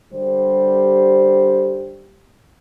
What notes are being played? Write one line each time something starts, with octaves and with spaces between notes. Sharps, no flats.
D3 G3 G4 C5